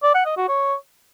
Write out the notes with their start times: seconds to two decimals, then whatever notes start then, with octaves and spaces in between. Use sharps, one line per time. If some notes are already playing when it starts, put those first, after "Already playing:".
0.03 D5
0.14 F#5
0.26 D#5
0.37 F#4
0.48 C#5